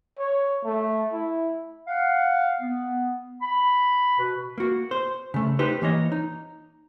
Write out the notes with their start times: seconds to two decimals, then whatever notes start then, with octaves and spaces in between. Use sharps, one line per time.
0.19 C#5
0.64 A3
1.13 E4
1.88 F5 F#5
2.61 B3
3.41 B5
4.19 B2 F#4 B4
4.58 A#3 F#4
4.91 C5
5.34 C#3 A3
5.59 D#4 G4 B4 C5
5.82 E3 A#3 C#5 D#5
6.12 D#4